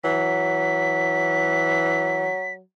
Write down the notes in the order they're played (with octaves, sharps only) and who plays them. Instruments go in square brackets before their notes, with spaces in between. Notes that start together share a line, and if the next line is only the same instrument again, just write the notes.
[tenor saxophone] E3 [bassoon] F#3 [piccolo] B6